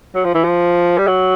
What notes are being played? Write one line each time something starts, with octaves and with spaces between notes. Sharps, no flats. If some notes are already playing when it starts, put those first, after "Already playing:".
F#3
F3
E3
F3
G3
F#3